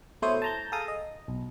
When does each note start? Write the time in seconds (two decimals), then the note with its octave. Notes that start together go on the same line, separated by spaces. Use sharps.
0.22 B2 A3 E4 C5 C#5 D#6
0.42 A5 A#5 G6
0.72 G#4 A4 F5 A5 A#5 D#6
0.88 D#5
1.28 B1